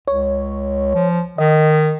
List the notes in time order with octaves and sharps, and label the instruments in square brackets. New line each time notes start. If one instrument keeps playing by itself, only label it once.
[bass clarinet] C#2 [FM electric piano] C#5
[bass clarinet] F3
[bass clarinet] D#3 [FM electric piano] D#5